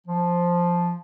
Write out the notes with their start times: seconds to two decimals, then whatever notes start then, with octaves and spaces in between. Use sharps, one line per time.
0.07 F3